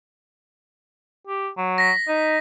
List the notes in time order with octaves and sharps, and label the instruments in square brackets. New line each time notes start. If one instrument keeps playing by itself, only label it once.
[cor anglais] G4
F#3
[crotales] A#6 B6
[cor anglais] D#4